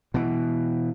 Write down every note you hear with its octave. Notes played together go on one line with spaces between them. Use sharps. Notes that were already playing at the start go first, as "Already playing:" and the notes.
B2 E3